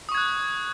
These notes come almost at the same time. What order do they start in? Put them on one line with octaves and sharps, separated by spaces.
D#6 C#6 G#6 F#6